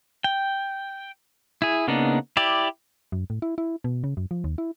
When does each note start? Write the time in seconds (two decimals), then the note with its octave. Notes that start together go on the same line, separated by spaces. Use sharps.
0.24 G5
1.62 E4 G#4
1.88 C#3 A#3 B3 D4 D#4
2.37 E4 G4 D5
3.12 F#2
3.30 A2
3.42 E4
3.58 E4
3.84 B2
4.04 C#3
4.17 F#2
4.31 F3
4.44 D#2
4.58 E4